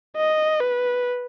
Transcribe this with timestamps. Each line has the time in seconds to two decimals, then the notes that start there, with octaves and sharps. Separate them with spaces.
0.16 D#5
0.61 B4